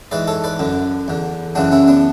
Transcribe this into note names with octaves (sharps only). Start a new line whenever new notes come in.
G#2 E3 B4 D5
A4 C#5
B4 D5
F#2 D3
E2 D3
F#2 C#3 E3 D4 F#4
C#4 E4
B3 D4